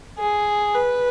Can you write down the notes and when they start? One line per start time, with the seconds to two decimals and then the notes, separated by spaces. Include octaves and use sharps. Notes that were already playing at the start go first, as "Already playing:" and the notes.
0.19 G#4
0.75 B4